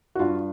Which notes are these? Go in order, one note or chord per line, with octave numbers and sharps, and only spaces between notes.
F#4
G2 F4